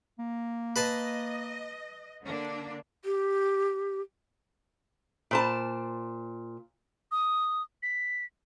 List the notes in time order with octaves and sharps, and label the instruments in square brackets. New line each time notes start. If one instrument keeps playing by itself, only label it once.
[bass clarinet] A#3
[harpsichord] B4 A5 C6 [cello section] D#5
[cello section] D3 A#3 D4
[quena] G4
[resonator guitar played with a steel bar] A#2 C5 A5
[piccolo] D#6
B6